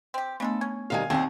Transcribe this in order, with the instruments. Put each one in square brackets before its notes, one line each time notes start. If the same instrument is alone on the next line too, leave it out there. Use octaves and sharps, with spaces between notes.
[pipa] C4 G4
[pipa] C#3 G#3 A4 [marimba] A3 B3 D4
[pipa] C#4 [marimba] G#6
[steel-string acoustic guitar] C3 D#3 G3 [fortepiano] F5 G#5
[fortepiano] D#2 [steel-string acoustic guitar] C4 F#5 A#5 [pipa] G#4